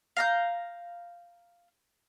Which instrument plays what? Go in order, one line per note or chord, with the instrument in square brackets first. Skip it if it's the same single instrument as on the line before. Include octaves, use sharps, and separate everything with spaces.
[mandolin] F5 A#5 G6